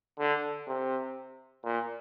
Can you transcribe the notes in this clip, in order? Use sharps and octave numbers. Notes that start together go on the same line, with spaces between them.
D3
C3
A#2